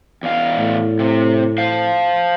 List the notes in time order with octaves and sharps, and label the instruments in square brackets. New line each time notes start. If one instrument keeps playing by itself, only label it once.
[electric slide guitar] E2 F5
[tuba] A2
[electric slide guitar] C3
C5 F5